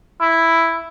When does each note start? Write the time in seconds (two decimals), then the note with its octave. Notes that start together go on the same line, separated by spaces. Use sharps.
0.20 E4